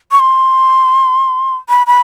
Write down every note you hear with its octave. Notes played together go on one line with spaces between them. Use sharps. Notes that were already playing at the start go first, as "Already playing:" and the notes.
C#6
C6
B5
B5